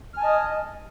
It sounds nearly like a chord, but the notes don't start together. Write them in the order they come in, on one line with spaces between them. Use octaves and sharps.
F6 G#5 A5 D#5 D#6